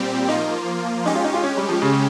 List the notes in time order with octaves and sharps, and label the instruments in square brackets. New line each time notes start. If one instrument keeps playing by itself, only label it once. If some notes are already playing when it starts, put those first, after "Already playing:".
Already playing: [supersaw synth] A#2 G3 C4 G4
[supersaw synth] F3 A#3 F4 [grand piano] D#4
[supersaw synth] G#3 C#4 G4 [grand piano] D#4
[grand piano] F4
D#4
F4
C#4
G3
F3
C#3